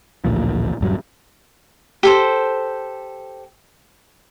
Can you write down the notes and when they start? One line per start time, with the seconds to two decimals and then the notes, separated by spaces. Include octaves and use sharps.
0.25 A1 D2 A#2 F3
0.81 D#1 G2 F#3
2.03 G4 A4 C5